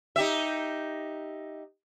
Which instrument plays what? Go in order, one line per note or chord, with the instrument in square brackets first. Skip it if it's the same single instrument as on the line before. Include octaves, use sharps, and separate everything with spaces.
[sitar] D#4 G4 E5